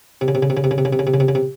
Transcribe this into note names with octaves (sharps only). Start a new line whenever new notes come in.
C3
C#3
C3
C#3
C3
C#3
C3
C#3
C3
C#3
C3
C#3
C3
C#3
C3
C#3
C3